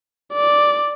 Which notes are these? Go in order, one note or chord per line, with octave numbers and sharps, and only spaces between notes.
D5